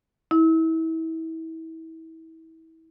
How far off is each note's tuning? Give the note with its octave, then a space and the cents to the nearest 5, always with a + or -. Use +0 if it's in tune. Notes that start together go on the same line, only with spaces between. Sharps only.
E4 -30